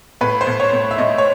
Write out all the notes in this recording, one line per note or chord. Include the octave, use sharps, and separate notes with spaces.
A2 B4
C5
A2
C#5
A2
E5
A2 D#5
C#5